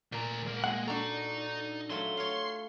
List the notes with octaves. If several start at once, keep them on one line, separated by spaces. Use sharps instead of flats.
D2 A#2 A#5
G#3 A#4
G#3 A#3 F#5
D4 D#4 F#4 A4 A#5
F#3 A3 F4 C6
C#5 F5